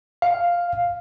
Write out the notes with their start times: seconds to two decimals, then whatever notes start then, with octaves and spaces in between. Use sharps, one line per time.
0.22 F5